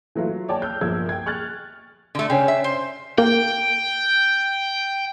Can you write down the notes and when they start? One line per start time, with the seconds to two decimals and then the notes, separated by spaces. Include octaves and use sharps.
0.15 E3 F#3 A3 F4
0.49 C#5 D5 G5 A5
0.62 E6 F6 G6
0.81 G1 A#2 F3 A#4 E6 G#6
1.09 G5 G#6
1.26 C#6 F6 F#6 G#6 A6
2.15 D3 A3
2.30 C#3 C#4 G5
2.48 E5
2.64 C5
3.18 A#3 G5